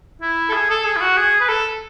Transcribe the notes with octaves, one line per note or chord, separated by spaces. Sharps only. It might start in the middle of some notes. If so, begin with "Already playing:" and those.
E4
A4
G#4
A4
G#4
E4
F#4
G#4
B4
A4